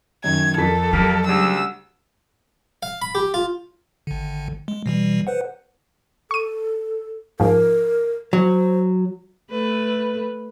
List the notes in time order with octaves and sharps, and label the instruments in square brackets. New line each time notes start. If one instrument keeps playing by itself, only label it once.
[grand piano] F#2 D#3 [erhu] G#6
[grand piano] F2 A#4 B6 [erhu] A4
[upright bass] F#3 [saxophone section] G3 A#3
[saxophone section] D2 [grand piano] C#3 G3 [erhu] E6
[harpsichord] F5
B5
G4
F4
[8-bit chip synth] G#1 D3
G#3
B2 E3 G3
B4 C5 F#5
[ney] A4 [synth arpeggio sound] C#6 D#7
[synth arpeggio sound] G#2 F3 [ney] A#4
[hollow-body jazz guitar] F#3 [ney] C5
[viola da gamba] A3 B4